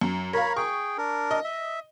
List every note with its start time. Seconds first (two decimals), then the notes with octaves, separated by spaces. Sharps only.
0.01 F#2
0.33 A#4 C#5 F5 B5
0.57 G#4 G5 C#6
0.98 D4 A#4
1.31 D#5
1.44 E5